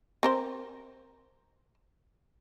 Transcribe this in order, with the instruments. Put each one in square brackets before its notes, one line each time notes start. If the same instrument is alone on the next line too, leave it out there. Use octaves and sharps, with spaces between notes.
[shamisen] C4 A#4 C5